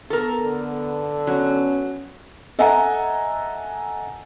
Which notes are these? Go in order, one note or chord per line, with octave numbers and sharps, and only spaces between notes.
B3 A4 A#4
D3
F#3 B3 C#4
A4 D#5 E5 F#5 G#5 A#5